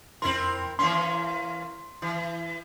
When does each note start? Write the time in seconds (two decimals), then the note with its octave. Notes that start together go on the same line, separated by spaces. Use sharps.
0.22 F2 C4 E4 A#4 C6
0.79 E3 A#3 C#4 C6
2.02 E3